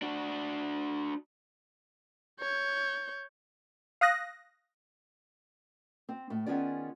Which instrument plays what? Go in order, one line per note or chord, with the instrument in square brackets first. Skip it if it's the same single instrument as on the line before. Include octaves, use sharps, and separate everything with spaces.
[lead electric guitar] D4 F#4
[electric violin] C#5 G6
[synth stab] F5 D#6 F#6 A#6
[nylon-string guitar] C4
A2
D#3 B3 C#4 F4 G#4 D5